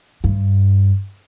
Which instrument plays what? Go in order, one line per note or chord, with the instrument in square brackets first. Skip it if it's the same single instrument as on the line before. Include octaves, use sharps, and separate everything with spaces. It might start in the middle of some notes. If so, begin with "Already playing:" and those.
[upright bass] G2